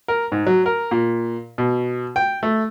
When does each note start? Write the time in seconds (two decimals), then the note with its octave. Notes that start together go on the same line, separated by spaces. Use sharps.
0.08 A#4
0.32 G#2
0.47 F#3
0.66 A#4
0.91 A#2
1.58 B2
2.16 G5
2.43 A3